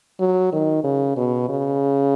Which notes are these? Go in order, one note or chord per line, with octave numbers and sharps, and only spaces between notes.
F#3
D#3
C#3
B2
C#3